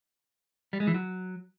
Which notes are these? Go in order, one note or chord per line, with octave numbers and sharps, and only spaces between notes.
G3
G#3
E3
F#3